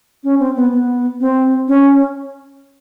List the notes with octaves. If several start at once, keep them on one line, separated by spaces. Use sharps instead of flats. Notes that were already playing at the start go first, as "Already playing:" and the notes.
C#4
C4
B3
B3
C4
C#4